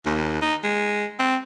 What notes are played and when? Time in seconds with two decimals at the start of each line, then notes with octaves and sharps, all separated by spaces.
0.06 D#2
0.42 D#4
0.63 G#3
1.19 C4